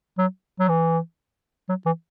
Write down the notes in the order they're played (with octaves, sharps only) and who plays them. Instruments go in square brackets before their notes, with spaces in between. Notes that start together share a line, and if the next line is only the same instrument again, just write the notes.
[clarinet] F#3
F#3
E3
F#3
E3